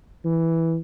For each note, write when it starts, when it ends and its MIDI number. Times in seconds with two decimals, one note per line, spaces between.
0.24 0.78 52